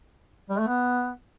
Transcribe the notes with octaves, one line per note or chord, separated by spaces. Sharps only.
G3
A3
B3